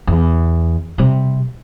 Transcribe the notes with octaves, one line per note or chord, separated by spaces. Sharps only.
E2
C3 G3